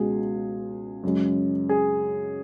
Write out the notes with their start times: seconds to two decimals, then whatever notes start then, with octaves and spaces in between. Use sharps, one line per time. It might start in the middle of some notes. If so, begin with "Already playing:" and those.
Already playing: C#2 B2 G#3 G#4
1.03 F#2 C#3 G#3
1.69 G#4